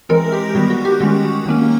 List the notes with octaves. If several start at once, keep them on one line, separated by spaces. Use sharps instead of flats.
E3 G#3 C4 A#4
G4
D#3 G3 B3 F#4
F#4
G4
D#3 G#3 C#4 F#4
D#3 F#3 A#3 C#4